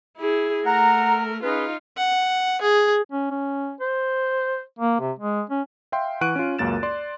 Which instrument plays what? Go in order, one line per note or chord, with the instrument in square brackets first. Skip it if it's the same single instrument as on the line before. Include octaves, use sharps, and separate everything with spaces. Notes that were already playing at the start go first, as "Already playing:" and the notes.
[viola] E4 G#4
[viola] A3 A#4 [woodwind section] F#5 A#5
[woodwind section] C#4 G#4 B4 [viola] D#4 F4
[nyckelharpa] F#5
G#4
[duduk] C#4
C#4
C5
A#3
C3
G#3
C#4
[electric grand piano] E5 F5 G5 C6
E3 F#5 C#6 F#6 D7 D#7
C#4 F4
C#2 F#2 A#3 A6 E7
D5 C6